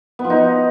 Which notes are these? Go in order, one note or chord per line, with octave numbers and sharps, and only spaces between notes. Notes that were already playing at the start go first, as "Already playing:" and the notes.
B3
F3
D#4